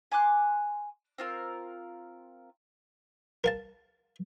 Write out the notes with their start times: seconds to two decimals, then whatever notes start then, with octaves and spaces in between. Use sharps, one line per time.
0.12 G#5 C6 D6 F#6
1.18 C4 F4 A#4
3.44 A#4 F5 A5